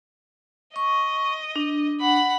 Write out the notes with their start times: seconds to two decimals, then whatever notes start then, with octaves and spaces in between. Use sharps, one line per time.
0.76 D#5 C#6
1.56 D4
2.01 F#5 B5